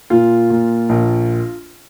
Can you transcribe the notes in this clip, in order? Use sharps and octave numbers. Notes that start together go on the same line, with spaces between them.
A#2 F4
A#2
A#1